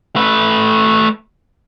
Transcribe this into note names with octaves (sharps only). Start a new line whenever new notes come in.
A3 B4